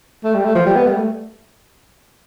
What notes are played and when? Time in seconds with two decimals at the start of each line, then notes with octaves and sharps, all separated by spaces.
0.24 A3
0.35 G3
0.45 A3
0.55 F3
0.66 G3
0.76 B3
0.87 G3
0.97 A3